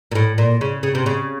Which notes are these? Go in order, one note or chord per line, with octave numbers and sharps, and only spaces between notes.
A#2
A2
A#2
C#3
C#3
C3
C#3